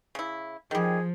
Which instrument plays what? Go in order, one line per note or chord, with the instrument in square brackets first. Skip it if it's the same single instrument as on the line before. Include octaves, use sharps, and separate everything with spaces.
[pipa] C#3 E4
[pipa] D#3 G3 [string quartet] F3 [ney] G#4